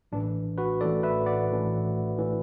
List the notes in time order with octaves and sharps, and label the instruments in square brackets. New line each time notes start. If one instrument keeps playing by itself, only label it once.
[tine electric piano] A1 A2 E3 D4
F#4 B4
A1 A2 E3 A4 D5
B4 E5
D5 F#5
A1 A2 E3
A2 E3